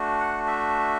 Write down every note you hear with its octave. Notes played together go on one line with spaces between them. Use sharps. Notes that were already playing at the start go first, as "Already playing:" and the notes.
Already playing: A3 D4 F#4
F#5
E5